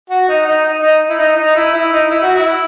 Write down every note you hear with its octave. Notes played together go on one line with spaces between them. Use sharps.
F#4
D#4
D#4
D#4
D#4
E4
D#4
D#4
E4
E4
D#4
E4
F#4
E4